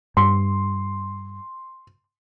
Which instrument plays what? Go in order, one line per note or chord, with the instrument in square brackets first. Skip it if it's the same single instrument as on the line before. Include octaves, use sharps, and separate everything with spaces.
[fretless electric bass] G2 [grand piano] C6